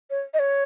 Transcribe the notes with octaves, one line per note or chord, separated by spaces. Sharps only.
C#5
D#5
C#5